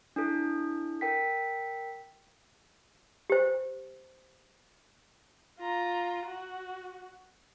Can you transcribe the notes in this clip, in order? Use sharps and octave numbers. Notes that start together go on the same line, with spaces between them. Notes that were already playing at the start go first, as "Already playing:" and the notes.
D4 E4 A4
A#4 G5 B6
G4 C5
F4 A#5
F#4